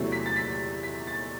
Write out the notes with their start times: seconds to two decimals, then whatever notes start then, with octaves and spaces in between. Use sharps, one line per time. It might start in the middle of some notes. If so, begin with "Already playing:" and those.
Already playing: E2 C3 F#3 A3 E4
0.12 B6
0.26 A6
0.36 B6
0.83 B6
1.07 A6